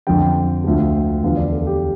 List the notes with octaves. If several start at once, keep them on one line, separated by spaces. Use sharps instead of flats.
F2 D3 F3 G5
D2 D3 F3
E2 D3 F3 F5
D5
A4
G4